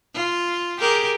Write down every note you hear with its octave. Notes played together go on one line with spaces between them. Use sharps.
F4
G4 G#4 A#4